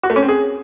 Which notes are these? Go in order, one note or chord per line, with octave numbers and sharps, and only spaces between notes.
F#4
A3
C#4
C4
G#4